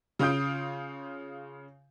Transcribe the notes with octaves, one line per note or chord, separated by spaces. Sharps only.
C#3 F4 D#6 G6 D7